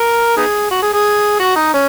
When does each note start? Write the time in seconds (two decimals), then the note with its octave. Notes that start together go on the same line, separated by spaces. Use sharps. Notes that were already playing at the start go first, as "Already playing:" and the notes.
Already playing: A#4
0.37 B3 D#4 G#4
0.71 F#4
0.82 G#4
0.94 G#4
1.40 F#4
1.56 D#4
1.74 C#4